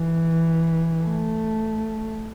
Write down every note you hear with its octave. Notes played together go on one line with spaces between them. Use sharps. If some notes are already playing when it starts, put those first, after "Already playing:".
Already playing: E3
A3